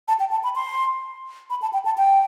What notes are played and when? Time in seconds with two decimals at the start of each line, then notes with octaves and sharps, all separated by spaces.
0.08 A5
0.20 G5
0.31 A5
0.44 B5
0.56 C6
1.50 B5
1.62 A5
1.73 G5
1.85 A5
1.98 G5